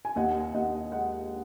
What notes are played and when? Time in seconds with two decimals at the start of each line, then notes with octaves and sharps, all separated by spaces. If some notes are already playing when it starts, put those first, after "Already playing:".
0.05 G#5
0.16 D#2 D#5 F#5
0.54 D#2 D#5 F#5
0.92 G#3 D#5 F#5